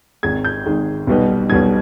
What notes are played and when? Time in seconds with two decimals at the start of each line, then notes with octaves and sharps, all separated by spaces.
0.23 G#1 G#2 D#3 G#3 G#6
0.45 G6
0.66 G#1 G#2 D#3 G#3
1.07 B1 B2 G3 B3 D#4
1.49 B1 B2 G3 B3 D#4 G#6